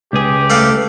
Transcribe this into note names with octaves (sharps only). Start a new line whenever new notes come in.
C#2 G4 G#4 B4
A3 D5 F5